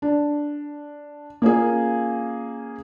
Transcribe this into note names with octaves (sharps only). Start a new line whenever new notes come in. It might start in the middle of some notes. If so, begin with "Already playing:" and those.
D4
A#3 C#4 F4 G#4